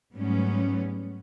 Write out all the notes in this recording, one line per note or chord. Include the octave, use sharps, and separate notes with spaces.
G#2 F#3 G3 A3 B3 C#4